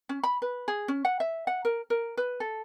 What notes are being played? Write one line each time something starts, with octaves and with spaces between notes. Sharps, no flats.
C#4
B5
B4
G#4
C#4
F#5
E5
F#5
A#4
A#4
B4
A4